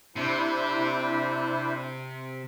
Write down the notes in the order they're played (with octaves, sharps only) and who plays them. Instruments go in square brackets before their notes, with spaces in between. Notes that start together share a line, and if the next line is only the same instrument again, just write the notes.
[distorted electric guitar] C3 [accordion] D4 E4 C5